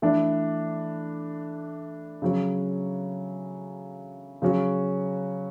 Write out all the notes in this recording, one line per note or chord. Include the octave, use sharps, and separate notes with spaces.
E3 A3 D4
C#3 F#3 C#4
C#3 F#3 C#4 F#4